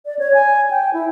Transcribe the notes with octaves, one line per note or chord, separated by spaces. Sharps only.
D5
C#5
G#5
G5
E4